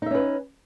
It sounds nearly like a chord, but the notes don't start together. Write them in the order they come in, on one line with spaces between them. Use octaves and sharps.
D#4 E5 C#4 B4